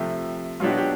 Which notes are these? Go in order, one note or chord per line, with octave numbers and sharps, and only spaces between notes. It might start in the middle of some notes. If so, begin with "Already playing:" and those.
Already playing: C3 F3 A3 G4
B2 F#3 B3 D4 F4 G4
F#4
G4